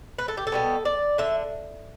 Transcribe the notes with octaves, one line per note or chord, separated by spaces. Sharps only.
B4
A4
G4
A4
B2 G3 B3
D5
D3 E5